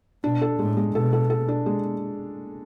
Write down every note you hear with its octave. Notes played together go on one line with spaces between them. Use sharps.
B2 D4
A4
A2 G#3
G#3
B2 A4
A4
A4
D4
G#3